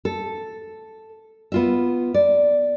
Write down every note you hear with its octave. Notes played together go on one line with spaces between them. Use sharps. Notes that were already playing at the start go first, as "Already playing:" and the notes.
A4
B3 F4 E5
D5